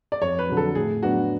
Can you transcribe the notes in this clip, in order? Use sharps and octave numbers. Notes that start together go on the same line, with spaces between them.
D5
F2 C#5
B4
D3 F#3
A4
A2 G#4
F#3 B3 D4 F#4